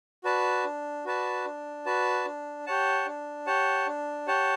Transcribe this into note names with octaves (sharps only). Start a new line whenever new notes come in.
F#4 B4 D5 A5
D4
F#4 B4 D5 A5
D4
F#4 B4 D5 A5
D4
G4 C#5 F#5 A5
D4
G4 C#5 F#5 A5
D4
G4 C#5 F#5 A5